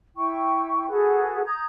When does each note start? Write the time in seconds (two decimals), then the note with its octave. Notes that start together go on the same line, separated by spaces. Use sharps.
0.16 E4 G5 C#6
0.90 F#4 G#4 A4 B4
1.46 A#5 D#6 G6 G#6